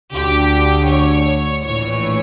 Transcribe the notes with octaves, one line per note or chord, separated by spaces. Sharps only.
D2 D3 G4
C#5
A#1 A2 E3 C#5